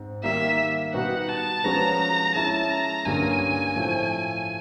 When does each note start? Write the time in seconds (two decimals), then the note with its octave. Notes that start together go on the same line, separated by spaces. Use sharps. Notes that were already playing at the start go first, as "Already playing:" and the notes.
Already playing: G#2 C4
0.23 D#3 G3 A#3 E5
0.94 B2 G3 B3 D#4 F#4 F#5
1.29 A5
1.64 F3 G#3 C#4 F#4 B4 A#5
2.35 G#3 C#4 E4 A5
2.70 A#5
3.05 G2 D3 F#3 A#3 C#4 G#5
3.76 A2 F3 A3 C4 F4